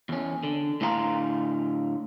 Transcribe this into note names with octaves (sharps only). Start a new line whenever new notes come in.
E2 C#4
D3
A2 D3 E4 F5 A#5 C6